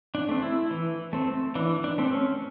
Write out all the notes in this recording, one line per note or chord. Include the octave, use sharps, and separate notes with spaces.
D4
A3 C4
E4
E3
A3 C4
E3 D4
D4
A3 C4
C#4